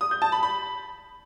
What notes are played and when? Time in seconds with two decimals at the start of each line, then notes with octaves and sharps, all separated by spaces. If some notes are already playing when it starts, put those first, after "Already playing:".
0.01 D#6
0.11 G6
0.22 A5
0.32 B5
0.43 B5